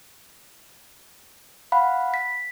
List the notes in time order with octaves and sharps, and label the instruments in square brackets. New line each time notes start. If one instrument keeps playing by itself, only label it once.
[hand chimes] F5 F#5 B5
B6